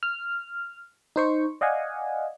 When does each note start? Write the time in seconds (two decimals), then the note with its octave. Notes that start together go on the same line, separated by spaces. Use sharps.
0.03 F6
1.16 D#4 C5 C#6
1.61 D5 D#5 F5 F#5 G#5